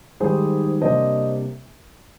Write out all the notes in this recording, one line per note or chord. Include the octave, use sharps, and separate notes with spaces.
G#2 D#3 G3 G#4 C5
C3 G3 A#3 D4 C5 D#5